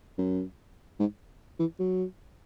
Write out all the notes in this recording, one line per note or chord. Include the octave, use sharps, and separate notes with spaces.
F#2
G#2
E3
F#3